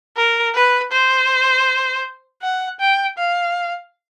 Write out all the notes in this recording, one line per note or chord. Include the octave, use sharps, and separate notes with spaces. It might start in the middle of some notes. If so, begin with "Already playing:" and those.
A#4
B4
C5
F#5
G5
F5